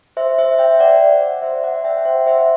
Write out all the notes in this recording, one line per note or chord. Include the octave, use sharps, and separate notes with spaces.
C5 E5
C5 E5
E5 G5
D5 F#5
C5 E5
D5 F#5
E5 G5
F#5
C5 E5
C5 E5
E5